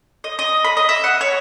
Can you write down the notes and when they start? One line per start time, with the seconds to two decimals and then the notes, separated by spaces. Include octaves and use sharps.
0.24 D#5
0.39 D#5
0.64 B5
0.77 D#5
0.89 E5
1.04 F#5
1.21 C#5